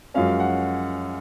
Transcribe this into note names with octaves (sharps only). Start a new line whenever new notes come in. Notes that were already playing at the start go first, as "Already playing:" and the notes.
F#2 F3 G#3 C#4 F5
F#5